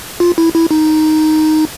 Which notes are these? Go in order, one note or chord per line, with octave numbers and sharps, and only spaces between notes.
F4
E4
E4
D#4